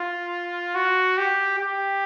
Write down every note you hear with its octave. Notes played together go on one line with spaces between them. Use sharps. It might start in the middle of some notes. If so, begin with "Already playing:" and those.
Already playing: F4
F#4
G4
G4